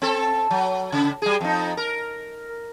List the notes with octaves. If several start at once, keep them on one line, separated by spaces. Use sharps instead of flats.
C4 A4
F#3
C#3
G3 G#4
F2 D#4
A#4